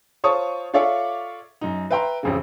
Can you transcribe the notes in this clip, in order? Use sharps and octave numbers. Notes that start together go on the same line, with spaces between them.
F4 C5 C#5 A5 C#6 D#6
F4 A4 C#5 D5 E5 F5
F#2 D#4
B4 E5 G5 A#5 C6
A1 F2 C#3